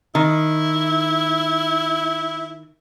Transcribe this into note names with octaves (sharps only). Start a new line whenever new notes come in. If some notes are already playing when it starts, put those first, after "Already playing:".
D#3 E4